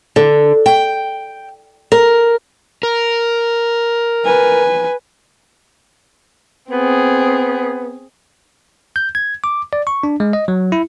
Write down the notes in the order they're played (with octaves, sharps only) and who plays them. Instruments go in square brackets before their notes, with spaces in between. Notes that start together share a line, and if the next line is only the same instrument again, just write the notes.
[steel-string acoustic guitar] D3
G5
A#4
[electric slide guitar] A#4
[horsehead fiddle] B4 G#5
[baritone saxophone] B3 [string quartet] C4 G#4
[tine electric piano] G6
G#6
D6
D5
C#6
D4
G#3
D#5
F#3
E4